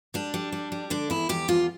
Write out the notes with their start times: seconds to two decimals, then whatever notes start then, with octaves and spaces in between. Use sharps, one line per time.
0.14 G3 D4
0.34 G3
0.52 G3
0.72 G3
0.90 D3 D4
1.10 E2 E4
1.29 E2 G4
1.48 E2 F4